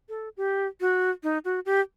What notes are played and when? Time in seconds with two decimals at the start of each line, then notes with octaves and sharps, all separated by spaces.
0.09 A4
0.37 G4
0.81 F#4
1.23 D#4
1.45 F#4
1.66 G4